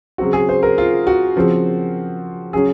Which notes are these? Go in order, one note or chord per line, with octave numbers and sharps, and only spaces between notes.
C#3 F#3 C4 F#4
G#4
C5
A#4
F4
F#4
C#3 F3 C4
C#3 F#3 C#4 G#4